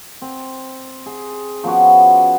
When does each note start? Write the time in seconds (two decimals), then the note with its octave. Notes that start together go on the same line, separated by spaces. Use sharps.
0.22 C4
1.06 G#4
1.64 F3 B3 C#4 F#4